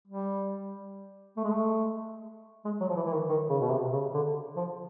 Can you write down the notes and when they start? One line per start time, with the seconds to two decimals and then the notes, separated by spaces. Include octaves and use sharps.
0.08 G3
1.37 A3
1.44 G#3
1.51 A3
2.65 G#3
2.81 F#3
2.89 F3
2.96 E3
3.07 E3
3.12 D#3
3.29 D#3
3.50 C#3
3.61 B2
3.71 C3
3.92 C#3
4.14 D3
4.56 F3